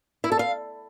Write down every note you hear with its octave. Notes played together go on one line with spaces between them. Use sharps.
E4
A4
F5